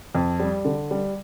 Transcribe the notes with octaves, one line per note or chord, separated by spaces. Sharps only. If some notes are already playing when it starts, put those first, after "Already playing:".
F2
G3
D3
G3